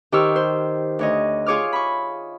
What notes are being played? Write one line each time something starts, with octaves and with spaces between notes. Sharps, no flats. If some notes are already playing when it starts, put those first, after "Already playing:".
D#3 G4 C5 C#6 E6 F6
C5
D2 C#5 D#5
F4 G#4 C#5 D6 F6
B5 C#6